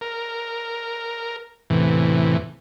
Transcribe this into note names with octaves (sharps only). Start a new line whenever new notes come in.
A#4
E2 A2 C3 E3